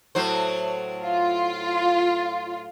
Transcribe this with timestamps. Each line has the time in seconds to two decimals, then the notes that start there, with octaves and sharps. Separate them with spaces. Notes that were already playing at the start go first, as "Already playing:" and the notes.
0.15 A2 F#3 C5
1.04 F4